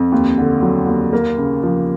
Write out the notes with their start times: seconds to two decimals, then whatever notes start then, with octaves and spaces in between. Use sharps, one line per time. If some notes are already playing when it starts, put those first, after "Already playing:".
Already playing: F2
0.12 D#2
0.38 D3
0.62 F#3
0.87 D#2
1.13 A#3
1.37 C#3
1.63 F3